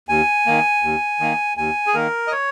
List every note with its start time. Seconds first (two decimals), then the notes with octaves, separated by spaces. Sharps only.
0.09 D#2 G#5
0.46 D#3 A#3
0.83 D#2
1.20 D#3 A#3
1.57 D#2 G#5
1.87 G#4
1.94 D#3 A#3 A#4
2.27 D#5
2.32 C#5